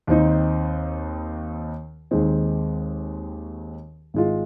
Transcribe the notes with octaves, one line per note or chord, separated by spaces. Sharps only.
D#2 D#3 C4 D#4
D#2 D#3 G#3 C4
G#1 G#2 G#3 F4